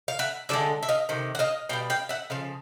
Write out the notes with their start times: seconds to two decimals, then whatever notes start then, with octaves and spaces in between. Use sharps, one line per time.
0.08 F5
0.19 E5 F#5
0.49 D3 F3 G#3 D5 E5
0.83 E5
0.89 D#5 F5
1.09 C3 D#3
1.35 F#5
1.39 D#5 F5
1.69 B2 G3 F5 G5
1.90 F5 G5
2.09 E5 F#5
2.30 C#3 F3 F5